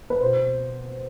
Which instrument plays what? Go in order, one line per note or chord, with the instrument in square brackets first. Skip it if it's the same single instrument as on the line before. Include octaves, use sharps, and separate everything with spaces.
[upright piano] B4
B2 C5